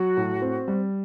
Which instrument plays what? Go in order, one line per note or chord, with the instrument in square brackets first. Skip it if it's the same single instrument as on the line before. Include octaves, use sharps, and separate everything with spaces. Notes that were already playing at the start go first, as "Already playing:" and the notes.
Already playing: [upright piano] F#3 [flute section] F#4
[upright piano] A2
C4
G3